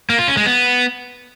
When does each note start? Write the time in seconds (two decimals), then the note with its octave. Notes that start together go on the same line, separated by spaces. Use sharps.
0.10 A#3
0.19 F4
0.28 C#4
0.37 G#3
0.46 B3